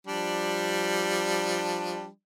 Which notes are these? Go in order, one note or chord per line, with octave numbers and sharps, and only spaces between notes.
F3 G3 D4